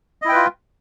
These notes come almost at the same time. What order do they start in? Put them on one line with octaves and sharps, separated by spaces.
D#5 E4 G5 B4 F4